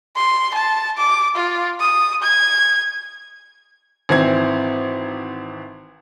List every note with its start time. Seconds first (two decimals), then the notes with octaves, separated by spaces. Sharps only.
0.16 C6
0.54 A5
0.98 D6
1.35 F4
1.80 D#6
2.23 G#6
4.09 G#1 E3 C4 G#6